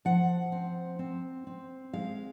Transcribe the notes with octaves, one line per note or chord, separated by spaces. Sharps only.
F3 F#5
C4
C4
C4
G#3 F5